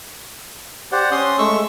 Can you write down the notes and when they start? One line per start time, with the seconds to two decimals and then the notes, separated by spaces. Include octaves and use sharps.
0.92 G4 C5 D5 F#5
1.11 C#4 C6 D#6
1.39 G#3 A3 C#6 E6